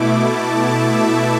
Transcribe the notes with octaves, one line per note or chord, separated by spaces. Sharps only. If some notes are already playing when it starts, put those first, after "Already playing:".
Already playing: B2 A3 E4 D6
A5
E5